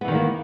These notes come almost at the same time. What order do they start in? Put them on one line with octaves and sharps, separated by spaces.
B3 E3 D#3 G3 A#3